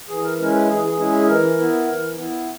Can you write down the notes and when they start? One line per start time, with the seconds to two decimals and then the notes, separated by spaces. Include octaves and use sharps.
0.09 E3 G#4
0.24 A#4
0.39 G#3 C#4 E4 A#4
0.53 B4
0.68 E3 G#4
0.84 G#4
0.98 G#3 C#4 E4 G#4
1.12 G#4
1.27 E3 A#4
1.58 B3 E4
1.87 E3
2.16 B3 E4